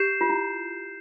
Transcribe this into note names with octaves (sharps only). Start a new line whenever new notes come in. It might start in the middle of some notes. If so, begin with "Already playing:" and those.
Already playing: G4 G6 C7 E7
F4
E4